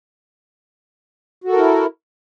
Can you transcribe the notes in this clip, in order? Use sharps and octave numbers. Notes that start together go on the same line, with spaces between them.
E4 F#4 A4 A#4